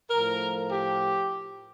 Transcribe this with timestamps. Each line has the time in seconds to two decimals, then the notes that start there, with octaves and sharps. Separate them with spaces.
0.10 A2 F3 A#4
0.71 G4